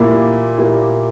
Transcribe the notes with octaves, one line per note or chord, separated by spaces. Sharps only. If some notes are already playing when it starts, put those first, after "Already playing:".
Already playing: A#2 A#3 E4 G4
A#2 A#3 E4 G4